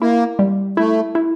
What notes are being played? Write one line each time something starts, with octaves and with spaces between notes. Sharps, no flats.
A#3 E4
G3
A3 E4
E4